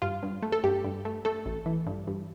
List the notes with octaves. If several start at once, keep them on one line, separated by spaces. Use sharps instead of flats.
G2 F4
G2
A3
A4
G2 G4
G2
A3
A3 A4
A1
E3
G2
G2